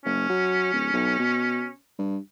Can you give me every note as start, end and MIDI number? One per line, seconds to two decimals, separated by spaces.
0.05 0.27 30
0.05 1.74 61
0.29 0.69 54
0.73 0.91 26
0.94 1.19 35
1.19 1.67 47
1.99 2.17 43